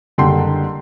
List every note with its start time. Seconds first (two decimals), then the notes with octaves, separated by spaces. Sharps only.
0.18 F#1 D3 G3 G5 C6